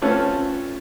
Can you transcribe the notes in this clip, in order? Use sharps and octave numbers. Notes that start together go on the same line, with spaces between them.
A3 C4 C#4 F4 A4 B4